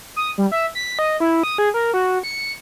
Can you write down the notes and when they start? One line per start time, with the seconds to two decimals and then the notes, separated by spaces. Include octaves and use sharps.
0.16 D#6
0.38 G3
0.52 E5
0.75 B6
0.99 D#5
1.20 E4
1.43 D#6
1.58 G#4
1.74 A#4
1.94 F#4
2.23 C#7